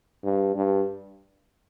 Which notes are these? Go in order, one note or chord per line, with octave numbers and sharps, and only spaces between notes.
G2
G2